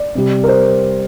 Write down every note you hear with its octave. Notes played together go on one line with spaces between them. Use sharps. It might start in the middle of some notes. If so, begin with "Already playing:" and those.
Already playing: D5
C3 G3
A#4
C5